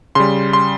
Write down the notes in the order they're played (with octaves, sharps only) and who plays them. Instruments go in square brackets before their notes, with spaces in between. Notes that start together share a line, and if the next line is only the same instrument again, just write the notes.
[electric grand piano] C#3 G3 C6
C6